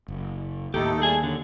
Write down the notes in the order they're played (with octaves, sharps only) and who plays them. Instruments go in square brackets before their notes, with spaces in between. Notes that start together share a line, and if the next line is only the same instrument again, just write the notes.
[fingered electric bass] F#1
[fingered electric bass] D#2 [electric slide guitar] A2 G4 [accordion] A3 D#4 A4
[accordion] G3 A3 A5 [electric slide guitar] G#4 G#5
[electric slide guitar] D3 [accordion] F#3